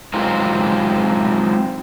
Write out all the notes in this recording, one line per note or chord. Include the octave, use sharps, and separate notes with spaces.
F#3 G#3 C4 D#4 F4